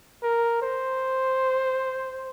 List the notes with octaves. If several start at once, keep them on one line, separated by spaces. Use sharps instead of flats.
A#4
C5